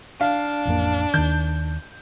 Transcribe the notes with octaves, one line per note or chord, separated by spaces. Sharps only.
D4 F5
A1 F2 A#3
D#2 D#3 G6